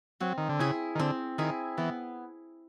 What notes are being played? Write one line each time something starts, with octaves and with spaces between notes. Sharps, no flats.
F#3 C4
D#3
D3
C#3 E4 G#4
D#3
D3 C4
D#3 E4 G#4
E3 B3